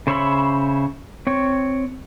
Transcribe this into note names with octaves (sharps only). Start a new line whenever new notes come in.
C#3 C5 C#5 E5 B5
C4 C#5